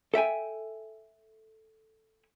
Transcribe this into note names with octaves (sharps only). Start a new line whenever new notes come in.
A4 E5 G5 G#5